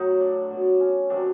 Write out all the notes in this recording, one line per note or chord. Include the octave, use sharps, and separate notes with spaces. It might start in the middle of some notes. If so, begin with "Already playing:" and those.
Already playing: A2 F#3 D#4
D4
B2 F#3
C#4
C3 D#3 F#3 D4